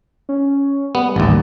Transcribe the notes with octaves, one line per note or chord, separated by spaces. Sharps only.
C#4
G3 B3
A1 D#2